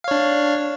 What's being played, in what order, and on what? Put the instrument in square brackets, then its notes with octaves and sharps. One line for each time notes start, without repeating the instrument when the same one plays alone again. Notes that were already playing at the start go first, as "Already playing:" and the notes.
[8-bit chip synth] F5
C#5
D4